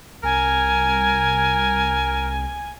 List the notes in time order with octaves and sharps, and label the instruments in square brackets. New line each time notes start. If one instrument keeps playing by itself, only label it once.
[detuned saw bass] C2 [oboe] A#4 [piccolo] G#5